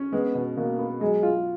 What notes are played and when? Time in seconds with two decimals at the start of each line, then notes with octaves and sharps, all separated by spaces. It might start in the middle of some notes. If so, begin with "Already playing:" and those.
Already playing: C#4
0.12 G#3 B3
0.35 B2
0.56 B2 A#3
0.78 B3
1.01 F#3 G#3
1.23 F4